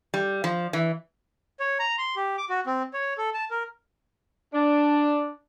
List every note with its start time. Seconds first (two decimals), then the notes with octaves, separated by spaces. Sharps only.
0.14 G3
0.44 F3
0.73 E3
1.60 C#5
1.79 A#5
1.98 C6
2.16 G4
2.38 D6
2.49 F#4
2.66 C4
2.93 C#5
3.18 A4
3.34 A5
3.51 A#4
4.54 D4